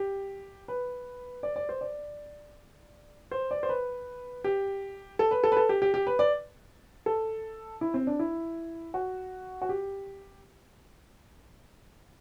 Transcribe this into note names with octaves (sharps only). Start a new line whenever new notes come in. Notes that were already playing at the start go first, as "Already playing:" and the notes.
Already playing: G4
B4
D5
D5
C5
D5
C5
D5
C5
B4
G4
A4
B4
A4
B4
A4
G4
G4
G4
B4
D5
A4
E4
C4
D4
E4
F#4
F#4
G4